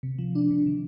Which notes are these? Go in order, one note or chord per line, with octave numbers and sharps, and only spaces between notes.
C3
F3
D4
C3
D#3